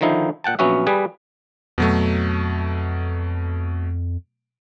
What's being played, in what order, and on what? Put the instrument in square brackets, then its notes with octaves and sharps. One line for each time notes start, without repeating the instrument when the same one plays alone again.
[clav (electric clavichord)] D3 D#3 F3 D#4 E4
A#2 F#5 G5 A5
A#1 F#3 B3 C#4 F#4 E5
G3 G#4 B4 G#5
[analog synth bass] F2 [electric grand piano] B2 F#3 A3